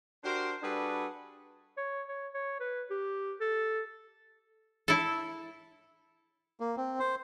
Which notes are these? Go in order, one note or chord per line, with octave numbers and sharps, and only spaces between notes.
D4 F#4 G4 A#4 C5
G3 D4 F#4 G#4 A4 B4
C#5
C#5
C#5
B4
G4
A4
E4 A4
A#3
C4
C5